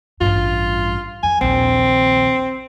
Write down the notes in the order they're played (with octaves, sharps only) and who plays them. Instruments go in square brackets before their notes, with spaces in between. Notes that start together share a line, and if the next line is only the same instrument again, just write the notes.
[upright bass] A1 G2 [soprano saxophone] F4
[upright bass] F2 [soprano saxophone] G#5
[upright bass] A#1 D#2 [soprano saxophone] C4